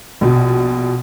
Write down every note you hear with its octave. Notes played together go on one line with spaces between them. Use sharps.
A#1 B2